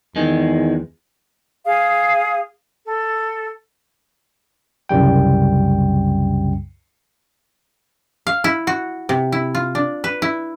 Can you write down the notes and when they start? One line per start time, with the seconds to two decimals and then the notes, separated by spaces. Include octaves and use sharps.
0.16 E2 D#3 G#3
1.66 G#4 F5 D#6
2.86 A4
4.89 C2 F#2 C#3 G3 G5
8.27 F5
8.44 E4
8.67 F#4
9.09 C3
9.32 E4
9.55 F4
9.75 D4
10.04 B4
10.22 E4